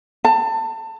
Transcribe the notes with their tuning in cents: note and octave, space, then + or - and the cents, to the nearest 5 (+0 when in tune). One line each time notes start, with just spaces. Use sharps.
A5 +25